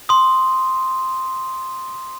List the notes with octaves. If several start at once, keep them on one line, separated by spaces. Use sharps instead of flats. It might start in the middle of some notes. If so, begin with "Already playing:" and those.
C6 D#6